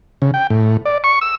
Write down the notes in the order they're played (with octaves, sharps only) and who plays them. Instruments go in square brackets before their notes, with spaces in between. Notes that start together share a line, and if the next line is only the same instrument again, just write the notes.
[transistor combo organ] C#3
G5
A2
D5
C#6
E6